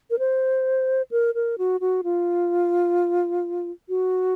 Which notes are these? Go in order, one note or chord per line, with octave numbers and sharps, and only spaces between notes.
A#4
C5
A#4
A#4
F#4
F#4
F4
F#4